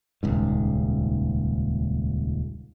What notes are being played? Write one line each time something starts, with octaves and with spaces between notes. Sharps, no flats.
D#1 C#2 G#2